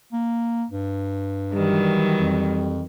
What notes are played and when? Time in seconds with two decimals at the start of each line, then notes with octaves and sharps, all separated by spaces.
0.12 A#3
0.70 G2
1.53 D#3 E3 F#3 G3
2.19 F2